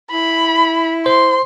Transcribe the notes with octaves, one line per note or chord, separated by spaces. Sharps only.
E4 B5
C5 C6